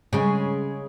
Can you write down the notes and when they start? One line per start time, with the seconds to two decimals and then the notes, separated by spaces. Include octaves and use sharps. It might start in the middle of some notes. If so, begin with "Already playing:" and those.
0.13 C#3 G#3